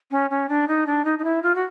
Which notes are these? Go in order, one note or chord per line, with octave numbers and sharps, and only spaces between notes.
C#4
C#4
D4
D#4
D4
D#4
D#4
E4
F4
F#4